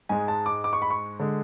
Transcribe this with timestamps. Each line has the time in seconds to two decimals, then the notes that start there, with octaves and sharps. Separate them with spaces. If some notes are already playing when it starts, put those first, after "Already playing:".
0.09 G#2 G#3 G#5
0.28 A5
0.46 D6
0.64 D6
0.73 C#6
0.82 B5
0.90 C#6
1.19 D3 G#3